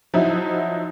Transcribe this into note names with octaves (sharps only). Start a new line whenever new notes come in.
F3 F#3 D#4 E4